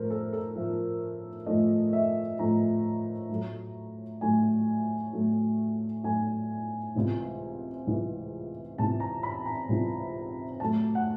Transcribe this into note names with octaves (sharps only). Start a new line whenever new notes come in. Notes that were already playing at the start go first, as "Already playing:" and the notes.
Already playing: A2 F3 A3 A#4 C5
A4
A4
A2 F3 A3
A2 F3 A3 D#5
E5
A2 F3 A3 A#5
A2 F#3 A3
A2 F#3 A3 G#5
A2 F#3 A3
A2 F#3 A3 G#5
C#2 C3 E3
C#2 C3 E3
C#2 C3 E3 A5
A#5
B5
A#5
C#2 C3 E3
A2 F#3 A3 A5
F#5